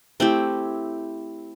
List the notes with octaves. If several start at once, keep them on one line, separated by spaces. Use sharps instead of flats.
A3 C4 E4 G4